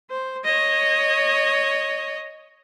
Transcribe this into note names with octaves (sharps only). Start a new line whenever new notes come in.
C5
C#5 D#5